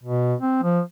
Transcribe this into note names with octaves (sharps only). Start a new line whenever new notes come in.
B2
C4
F3